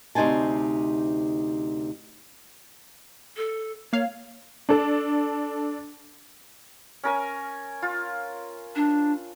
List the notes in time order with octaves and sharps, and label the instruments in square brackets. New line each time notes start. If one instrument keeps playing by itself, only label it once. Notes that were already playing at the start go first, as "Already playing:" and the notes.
[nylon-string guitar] D2 C3 D#4 C5 G#5 A5
[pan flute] A4
[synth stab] A#3 F5 [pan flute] C#5
[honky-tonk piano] D4 A4
[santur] C#4 A#4 G#5
F4
[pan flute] D4